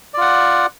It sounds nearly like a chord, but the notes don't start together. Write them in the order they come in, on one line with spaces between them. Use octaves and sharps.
D5 F4 F#5